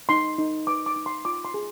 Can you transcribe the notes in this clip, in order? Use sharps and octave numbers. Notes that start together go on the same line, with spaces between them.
D#4 C6
D#4
B4 D6
D6
D#4
C6
F4 D6
C6
G#4